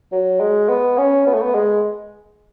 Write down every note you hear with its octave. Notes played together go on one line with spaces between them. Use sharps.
F#3
G#3
B3
C#4
B3
A3
B3
G#3